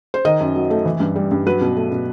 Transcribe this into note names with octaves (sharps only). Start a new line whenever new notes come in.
C5
D#3 D#5
F#2
F#3
A3
E3
G2
G3
G2
F#3 B4
B2
A3
B2